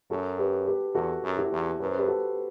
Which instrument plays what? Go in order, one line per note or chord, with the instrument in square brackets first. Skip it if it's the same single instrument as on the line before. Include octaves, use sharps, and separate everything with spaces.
[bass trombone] F#2 [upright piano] F#4 A4
[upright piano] G4 B4
G4 B4
[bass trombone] E2 [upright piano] F#4 A4
[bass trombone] F#2
[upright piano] E4 G4
[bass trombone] E2
[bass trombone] F#2 [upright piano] B4
[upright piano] C5
G4 B4
F#4 A4